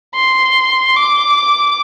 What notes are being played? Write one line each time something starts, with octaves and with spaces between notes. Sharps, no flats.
C6
D6